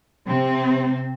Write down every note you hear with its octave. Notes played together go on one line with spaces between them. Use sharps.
C3 C4